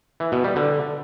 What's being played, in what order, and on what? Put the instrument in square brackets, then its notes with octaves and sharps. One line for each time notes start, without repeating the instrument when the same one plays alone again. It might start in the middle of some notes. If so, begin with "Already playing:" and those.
[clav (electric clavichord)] E3
B2
G3
D3